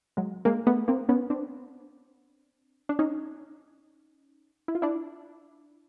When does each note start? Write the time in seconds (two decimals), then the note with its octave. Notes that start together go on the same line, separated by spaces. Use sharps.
0.17 F#3 G#3
0.45 G#3 A#3
0.67 A3 B3
0.88 A#3 C4
1.09 B3 C#4
1.30 C4 D4
2.89 D4
2.99 C#4 D#4
4.68 E4
4.75 F4
4.82 D4 E4